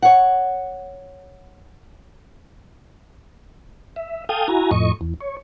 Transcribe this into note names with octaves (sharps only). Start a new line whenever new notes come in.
C#5 F#5
E5
A4 F5 G5 G#5 D#6
E4 F#4 G#5 A#5
F2 A2 D#5 C#6
E2
C#5